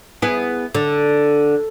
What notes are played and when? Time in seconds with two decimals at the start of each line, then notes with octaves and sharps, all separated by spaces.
0.22 B3 E4 G#4
0.75 D3